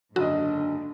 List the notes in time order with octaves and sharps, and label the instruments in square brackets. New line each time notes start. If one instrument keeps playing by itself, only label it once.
[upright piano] F#1 D#5 [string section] G#2 D3 [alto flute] D4 [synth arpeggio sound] F#4